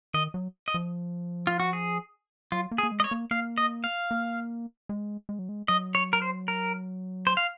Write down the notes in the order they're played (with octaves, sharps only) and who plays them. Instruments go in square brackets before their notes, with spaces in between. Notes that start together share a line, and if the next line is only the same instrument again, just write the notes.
[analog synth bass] D#3 [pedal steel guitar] D#5
[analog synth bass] F#3
[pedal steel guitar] D#5
[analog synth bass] F3
[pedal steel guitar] F4
F#4
G#4
[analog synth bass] F#3 [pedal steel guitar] F4
[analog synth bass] A#3
[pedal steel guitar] G#4
[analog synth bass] A#3
G#3
[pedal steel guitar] D#5
C#5
[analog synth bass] A#3
[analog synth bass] A#3 [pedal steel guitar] F5
[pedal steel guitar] D#5
F5
[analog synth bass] A#3
G#3
G#3
F#3
G#3
[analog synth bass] F#3 [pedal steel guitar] D#5
[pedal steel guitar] C#5
A#4
C5
A#4
C5
F5